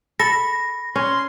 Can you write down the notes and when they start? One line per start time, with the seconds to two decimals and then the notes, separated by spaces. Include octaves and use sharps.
0.19 A4 B5 A#6
0.96 C#4 C6